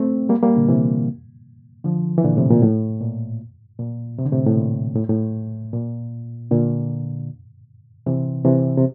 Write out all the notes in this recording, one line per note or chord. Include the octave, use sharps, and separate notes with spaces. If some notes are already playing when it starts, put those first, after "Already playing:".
Already playing: A3 C4
G3 A#3
G3 A#3
A#2 D3
C3 E3
D3 F3
E3
A#2 D3
A2 C3
A#2
A2
A#2
A#2
C3
D3
A2 C3
A2
A#2
A2
A2
A#2
A#2 D3
C3 E3
C3 E3
C3